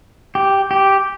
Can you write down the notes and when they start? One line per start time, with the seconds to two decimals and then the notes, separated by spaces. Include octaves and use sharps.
0.35 G4
0.71 G4